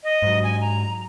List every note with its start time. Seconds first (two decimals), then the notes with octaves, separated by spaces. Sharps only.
0.04 D#5
0.22 G#2 F#3
0.43 G#5
0.61 A#5